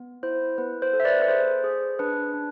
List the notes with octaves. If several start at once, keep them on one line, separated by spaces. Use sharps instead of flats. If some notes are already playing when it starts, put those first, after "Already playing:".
Already playing: B3
E4 C5
B3 B4
C5
A4
E5
B4 D5
B4
G#4 C5
G#4
D4 B4
D4